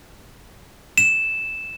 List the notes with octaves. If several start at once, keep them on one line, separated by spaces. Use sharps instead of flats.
E7